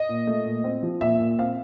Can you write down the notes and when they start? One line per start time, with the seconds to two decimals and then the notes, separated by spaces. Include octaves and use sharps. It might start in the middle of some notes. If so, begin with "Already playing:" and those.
Already playing: D#5
0.09 A#2
0.27 A3
0.45 A#2
0.64 C4
0.83 F3
1.01 A#2 E5
1.20 A#2
1.38 C4 F5